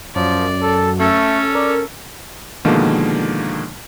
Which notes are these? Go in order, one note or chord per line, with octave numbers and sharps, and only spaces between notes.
F#2 F3 D5
A4
A3 C#4 A4
A#4 D5
B2 D3 D#3 F3 G#3 A#3